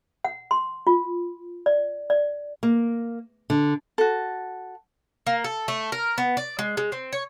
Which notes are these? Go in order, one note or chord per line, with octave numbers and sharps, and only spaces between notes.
F#5
C6
F4
D5
D5
A#3
D3
F#4 A4
A#3
A4
A3
A#4
B3
D5
G#3
G#3
C4
C#5